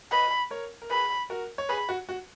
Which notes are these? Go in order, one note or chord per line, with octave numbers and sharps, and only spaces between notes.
B4 D#5 B5
A#4 C#5
A#4
G#4 B4 B5
F#4 A#4
C#5
G#4 B4 B5
F#4
F#4